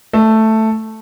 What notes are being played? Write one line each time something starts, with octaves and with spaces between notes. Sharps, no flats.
A3